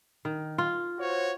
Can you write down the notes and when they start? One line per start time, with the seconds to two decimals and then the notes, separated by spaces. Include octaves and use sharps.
0.25 D#3
0.58 F4
0.99 F#4 C5 C#5